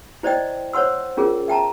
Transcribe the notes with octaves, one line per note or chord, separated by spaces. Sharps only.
E4 C5 D5 D#5 G5
C5 C#5 F#5 C6 E6
C#4 F4 G#4 A#4
E5 G5 A5 A#5